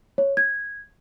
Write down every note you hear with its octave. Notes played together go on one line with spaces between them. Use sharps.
C#5
G#6